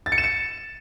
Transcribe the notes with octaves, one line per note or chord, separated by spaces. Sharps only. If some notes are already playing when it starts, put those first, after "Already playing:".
A6
C#7
E7
C#7